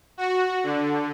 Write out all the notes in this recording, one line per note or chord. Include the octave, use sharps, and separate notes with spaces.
F#4
D3